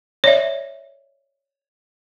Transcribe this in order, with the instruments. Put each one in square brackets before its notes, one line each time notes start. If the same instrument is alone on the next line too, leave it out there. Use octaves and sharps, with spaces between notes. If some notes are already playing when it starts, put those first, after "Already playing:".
[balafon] C#5 D5 E5